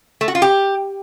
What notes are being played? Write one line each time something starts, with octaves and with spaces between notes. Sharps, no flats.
A3
F#4
F4
G4